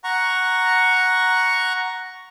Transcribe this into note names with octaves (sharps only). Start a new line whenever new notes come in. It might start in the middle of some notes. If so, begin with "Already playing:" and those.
F#5 A#5 C#6